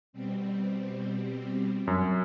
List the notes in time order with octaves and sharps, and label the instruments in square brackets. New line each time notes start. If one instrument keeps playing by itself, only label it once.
[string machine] B2 G3 C4
[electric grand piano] F#2